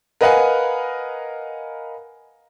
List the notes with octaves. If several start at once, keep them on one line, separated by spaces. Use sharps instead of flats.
A#4 B4 D#5 F5 F#5 G#5